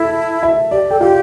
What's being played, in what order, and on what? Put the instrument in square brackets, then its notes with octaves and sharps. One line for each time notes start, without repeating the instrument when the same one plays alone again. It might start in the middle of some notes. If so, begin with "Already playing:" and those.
Already playing: [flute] E4 [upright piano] A4 A5
[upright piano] E5
[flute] G4 [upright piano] D5
[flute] A4 [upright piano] G5
[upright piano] F4 F5 [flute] G4